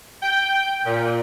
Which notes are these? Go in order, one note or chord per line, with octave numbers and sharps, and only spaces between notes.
G5
A#2